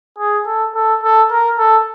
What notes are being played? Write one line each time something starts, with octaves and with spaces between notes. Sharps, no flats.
G#4
A4
A4
A4
A#4
A4